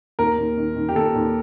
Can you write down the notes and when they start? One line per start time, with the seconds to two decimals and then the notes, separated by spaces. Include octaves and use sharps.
0.19 D#2 A#4
0.38 D#2
0.57 D#3
0.76 D#3
0.89 G4
0.95 D#2 A4
1.15 D#2